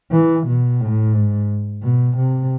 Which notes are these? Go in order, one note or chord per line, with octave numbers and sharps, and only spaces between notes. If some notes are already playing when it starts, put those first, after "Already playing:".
E3
B2
A2
G#2
B2
C3